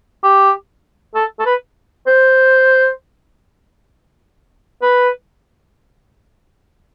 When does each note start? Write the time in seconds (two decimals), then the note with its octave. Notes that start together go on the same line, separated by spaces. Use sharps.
0.23 G4
1.15 A4
1.39 A4
1.46 B4
2.07 C5
4.82 B4